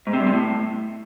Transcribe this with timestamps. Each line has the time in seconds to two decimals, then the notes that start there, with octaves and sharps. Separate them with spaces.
0.07 G#2
0.13 C3
0.20 G2
0.27 C3
0.33 A2